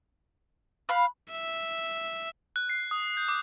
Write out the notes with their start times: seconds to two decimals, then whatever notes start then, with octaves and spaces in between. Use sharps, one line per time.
0.89 F5 B5 F#6
1.32 E5
2.56 F#6
2.69 C7
2.91 D#6
3.17 G6
3.28 D6